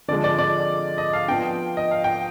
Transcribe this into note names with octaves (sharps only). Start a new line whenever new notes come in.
D3 F3 G#3 D5
D5
D5
D#5
F5
F3 B3 D4 G5
D#5
F5
G5